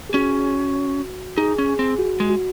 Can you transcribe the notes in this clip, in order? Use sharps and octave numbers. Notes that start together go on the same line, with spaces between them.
G#4
C#4 F#4
D#4 G#4
C#4
G#4
C4
F#4
G#3
F#4